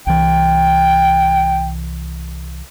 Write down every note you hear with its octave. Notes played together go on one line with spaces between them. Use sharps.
C2 E3 G5